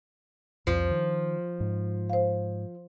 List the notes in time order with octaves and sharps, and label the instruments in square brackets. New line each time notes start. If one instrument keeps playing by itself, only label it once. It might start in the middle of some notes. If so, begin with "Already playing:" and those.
[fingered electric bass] C2 F2 [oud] F3
[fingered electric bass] D#3
G#2
[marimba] C5 F5